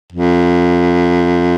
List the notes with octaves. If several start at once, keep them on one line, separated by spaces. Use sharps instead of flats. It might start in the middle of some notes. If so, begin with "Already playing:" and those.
F2